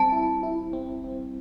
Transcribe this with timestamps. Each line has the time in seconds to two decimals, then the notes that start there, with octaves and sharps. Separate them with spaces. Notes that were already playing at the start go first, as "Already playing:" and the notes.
Already playing: G3 C4 A5
0.12 E4
0.43 E4
0.73 C4
1.04 C4